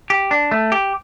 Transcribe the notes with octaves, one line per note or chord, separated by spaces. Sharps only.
G4
D4
A3
G4